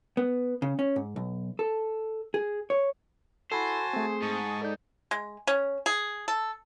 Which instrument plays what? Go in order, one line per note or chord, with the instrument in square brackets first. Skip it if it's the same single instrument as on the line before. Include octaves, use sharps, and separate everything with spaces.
[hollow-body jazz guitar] B3
C#3
C#4
G#2
B1
A4
G#4
C#5
[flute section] E4 F#5 [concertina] F#4 G#5 A5 [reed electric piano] A4 B5 [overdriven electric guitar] C5
[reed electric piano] A3 C4 [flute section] G#4
[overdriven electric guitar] G#2 [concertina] A5 C#6 D#6
[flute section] D#4 [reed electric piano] A4 D5 G6
[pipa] G#3
C#4
G#4
A4